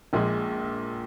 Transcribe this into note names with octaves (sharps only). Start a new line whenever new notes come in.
A#1 A#2 G#3